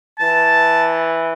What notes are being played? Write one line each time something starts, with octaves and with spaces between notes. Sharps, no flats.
E3 A5